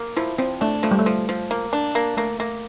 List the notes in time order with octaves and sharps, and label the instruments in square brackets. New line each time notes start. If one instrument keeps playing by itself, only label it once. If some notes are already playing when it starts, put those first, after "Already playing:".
Already playing: [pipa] A#3
[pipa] F3 [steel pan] E4
[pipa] F3 [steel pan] C4
[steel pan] A3 [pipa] D4
[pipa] F3 [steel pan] A3
[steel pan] G3
A3
[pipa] F3
F3
A#3
D4
A#3
[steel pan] A3 [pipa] A#3
[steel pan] A3 [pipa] A#3